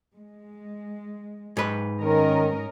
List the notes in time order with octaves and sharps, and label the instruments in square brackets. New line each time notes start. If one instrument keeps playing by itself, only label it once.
[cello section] G#3
[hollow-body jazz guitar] G#2 B4
[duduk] D#3 [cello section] C#4 A#4 D#5